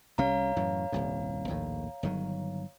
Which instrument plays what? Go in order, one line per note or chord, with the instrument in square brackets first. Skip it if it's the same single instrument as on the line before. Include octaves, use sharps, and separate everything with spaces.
[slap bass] C2 G3 C#4 [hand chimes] C#5 F5 A#5
[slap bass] F#2 A2 E3
D#1 C2 G2
A#1 D#2 A2
G1 D#3 F#3